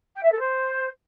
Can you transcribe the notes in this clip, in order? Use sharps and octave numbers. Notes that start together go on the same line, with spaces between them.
G5
E5
A4
C5